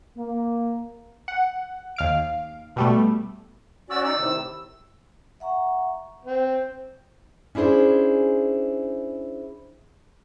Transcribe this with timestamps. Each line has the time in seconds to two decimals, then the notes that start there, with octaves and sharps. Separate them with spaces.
0.18 A#3
1.28 F#5
1.96 D#2 F5 D7
2.76 B2 G3 A3
3.90 C#4 F#4 D5 E6
4.03 D#4 D5 E6
4.18 A2 C3 D#3
5.40 E5 F#5 A#5 C#6
6.25 C4
7.55 C#4 D4 E4 G#4 C5